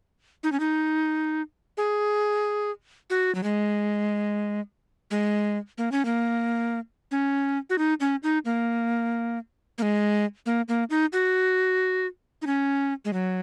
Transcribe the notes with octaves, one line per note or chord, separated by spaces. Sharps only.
D#4
C#4
D#4
G#4
F#4
F#3
G#3
G#3
A#3
C#4
A#3
C#4
F#4
D#4
C#4
D#4
A#3
A#3
G#3
A#3
A#3
D#4
F#4
D#4
C#4
G#3
F#3